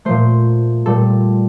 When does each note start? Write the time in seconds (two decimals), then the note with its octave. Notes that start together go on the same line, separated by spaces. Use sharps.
0.05 A#2 F3 A3 C5
0.86 A#2 G3 A4